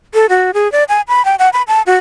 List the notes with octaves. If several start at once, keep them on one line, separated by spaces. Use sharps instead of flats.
A4
F#4
G#4
D5
G#5
B5
G5
F#5
B5
A5
F#4